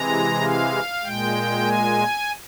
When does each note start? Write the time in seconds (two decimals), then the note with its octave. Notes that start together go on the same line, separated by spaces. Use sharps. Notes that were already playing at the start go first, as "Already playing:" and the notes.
Already playing: C3 E3 G#3 A#5
0.43 F5
1.04 A#2 G#3 G5
1.67 G#5